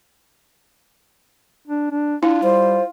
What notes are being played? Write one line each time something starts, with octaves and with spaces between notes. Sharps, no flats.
D4
D4
D4 E4 F4
G3 C5